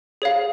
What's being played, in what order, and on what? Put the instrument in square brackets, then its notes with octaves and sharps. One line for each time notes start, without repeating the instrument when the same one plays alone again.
[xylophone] G#4 C#5 F5